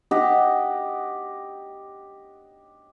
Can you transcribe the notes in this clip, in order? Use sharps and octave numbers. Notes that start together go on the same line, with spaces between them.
G4 D#5 F#5